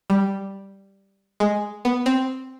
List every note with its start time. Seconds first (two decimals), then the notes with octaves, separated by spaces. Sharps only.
0.10 G3
1.40 G#3
1.85 B3
2.06 C4